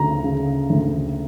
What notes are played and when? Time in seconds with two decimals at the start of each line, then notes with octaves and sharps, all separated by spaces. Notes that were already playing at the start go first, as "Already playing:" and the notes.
Already playing: D2 C#3 A#5
0.24 C#3
0.70 D2